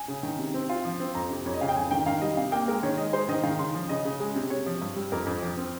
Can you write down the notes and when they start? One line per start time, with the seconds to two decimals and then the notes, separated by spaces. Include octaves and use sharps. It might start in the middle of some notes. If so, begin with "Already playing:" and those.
Already playing: G#5
0.08 C#3
0.23 D#3
0.39 C3
0.54 C4
0.69 F4
0.85 F3
1.00 C4
1.15 F2 A#5
1.30 C3
1.46 F2 C#5
1.54 D#5
1.61 C#3 F5
1.69 G5
1.76 F2 G#5
1.91 D#3 G5
2.06 D#3 F5
2.22 G3 D#5
2.37 C3 F5
2.52 A#3 G5
2.68 G#3 A#4
2.83 D#3 C#5
2.98 G#3 D#5
3.13 G#3 C5
3.29 D#3 D#5
3.43 D#3 F5
3.59 C#3 C6
3.74 F3
3.89 C#3 D#5
4.05 C#3
4.20 G#3
4.35 C3
4.50 C3 C#5
4.66 F3
4.81 G2
4.96 G3
5.12 F2 A#4
5.26 F2
5.42 F3
5.57 C4